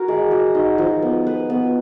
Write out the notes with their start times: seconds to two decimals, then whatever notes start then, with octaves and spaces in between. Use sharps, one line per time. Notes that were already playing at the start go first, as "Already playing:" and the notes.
Already playing: F#4 A#4
0.08 G#3
0.31 F#4
0.55 D#4
0.78 F3
1.02 B3
1.27 B4
1.50 B3